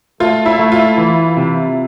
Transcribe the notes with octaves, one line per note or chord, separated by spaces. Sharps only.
A3 F4
E4
A3
F4
E3
C3